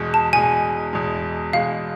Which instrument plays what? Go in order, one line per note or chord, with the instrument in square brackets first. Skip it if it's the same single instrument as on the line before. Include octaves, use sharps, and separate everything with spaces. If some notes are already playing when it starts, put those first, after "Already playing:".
Already playing: [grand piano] E2 B2 G#3
[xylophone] A5
[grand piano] E2 B2 G#3 [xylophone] G#5
[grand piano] E2 B2 G#3
[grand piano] E2 B2 G#3 [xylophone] F5